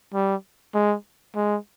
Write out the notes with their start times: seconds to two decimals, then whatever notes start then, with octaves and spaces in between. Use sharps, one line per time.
0.14 G3
0.74 G#3
1.36 G#3